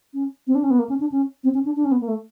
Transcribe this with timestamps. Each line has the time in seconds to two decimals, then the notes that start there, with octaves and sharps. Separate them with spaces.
0.14 C#4
0.47 C4
0.55 D4
0.63 C#4
0.71 B3
0.79 A#3
0.89 C#4
1.00 D4
1.12 C#4
1.44 C4
1.54 C#4
1.65 D4
1.76 D4
1.85 C#4
1.92 B3
2.01 A#3
2.08 A3